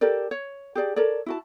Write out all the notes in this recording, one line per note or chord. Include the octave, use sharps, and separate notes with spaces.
G4 A4 A#4 D5
C#5
G4 G#4 D5 A5
A4 A#4 C#5 D5
E4 F#4 A5